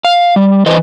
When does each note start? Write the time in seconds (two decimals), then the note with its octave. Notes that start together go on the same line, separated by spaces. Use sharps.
0.05 F5
0.36 G3
0.66 E3 B4 C5 D#5